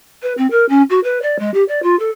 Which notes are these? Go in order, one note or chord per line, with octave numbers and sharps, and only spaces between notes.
B4
C4
A#4
C#4
F#4
B4
D5
G#3
G4
D5
F4
A4